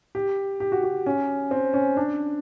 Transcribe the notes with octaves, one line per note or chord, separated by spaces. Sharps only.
G4
G4
F#4
F#4
C#4
C4
C#4
D4